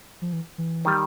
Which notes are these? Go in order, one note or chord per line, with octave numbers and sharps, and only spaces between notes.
F3
E3
E3
D#3 G3